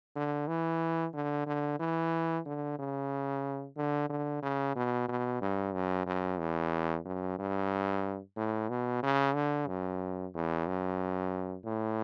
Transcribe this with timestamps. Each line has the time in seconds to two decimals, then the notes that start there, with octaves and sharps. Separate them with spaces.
0.16 D3
0.48 E3
1.14 D3
1.47 D3
1.80 E3
2.46 D3
2.79 C#3
3.77 D3
4.10 D3
4.43 C#3
4.76 B2
5.08 B2
5.42 G2
5.74 F#2
6.06 F#2
6.39 E2
7.05 F#2
7.39 G2
8.37 A2
8.70 B2
9.03 C#3
9.35 D3
9.68 F#2
10.34 E2
10.67 F#2
11.65 A2